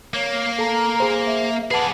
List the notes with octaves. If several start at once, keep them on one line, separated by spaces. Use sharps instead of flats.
A#3 C#5
A4 A#5
G#4 C5
E5
G#4 B4 D5 F#5 A5